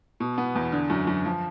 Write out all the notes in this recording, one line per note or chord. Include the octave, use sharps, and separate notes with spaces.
B2
B3
E2
D3
F#2
F#2
F3